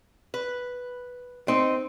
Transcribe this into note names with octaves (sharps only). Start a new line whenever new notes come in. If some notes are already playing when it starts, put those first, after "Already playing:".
B4
C4 D#4